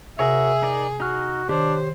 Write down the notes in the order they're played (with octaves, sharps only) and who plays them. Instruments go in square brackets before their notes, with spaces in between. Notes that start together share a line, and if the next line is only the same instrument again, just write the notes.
[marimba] C3 [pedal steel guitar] F#4 A#4 C#5 [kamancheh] G#4 [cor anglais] E5
[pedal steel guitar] D#4 A#4 D5
[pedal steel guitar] D#4 F6 [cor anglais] F#4
[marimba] D#3 [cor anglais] D4 [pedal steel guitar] G4 C#5 [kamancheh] C5